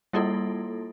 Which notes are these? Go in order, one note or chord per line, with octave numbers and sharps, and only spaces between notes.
G3 A#3 E4 F4 A4